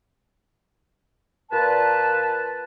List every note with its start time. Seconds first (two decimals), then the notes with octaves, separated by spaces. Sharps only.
1.51 A#2 B4 A5